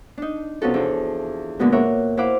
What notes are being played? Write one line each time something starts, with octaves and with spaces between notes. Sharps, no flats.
D4 D#4
C3 B3 C#4 F4 F#4 A4
E2 F3 D4
A#2 D3 G#3 B3 F#4
F4 A#4 C#5 E5 F#5
E4 C5 F5 F#5 B5 D6